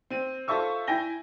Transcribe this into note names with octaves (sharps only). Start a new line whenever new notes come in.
C4 D#7
F4 A4 C5 E5 C#6 E6
E4 G5 G#5 A#6 G7